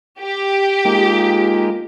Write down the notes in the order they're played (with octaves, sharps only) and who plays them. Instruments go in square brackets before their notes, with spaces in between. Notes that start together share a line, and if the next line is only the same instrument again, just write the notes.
[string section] G4
[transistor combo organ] G#3 A#3 D#4 [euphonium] F4